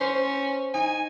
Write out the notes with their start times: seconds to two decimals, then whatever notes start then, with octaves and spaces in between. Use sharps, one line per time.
0.01 C#4 C5
0.74 D#4 G#5